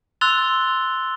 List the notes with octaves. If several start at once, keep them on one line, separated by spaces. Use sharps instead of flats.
C6 E6 F#6 A6 F7 G7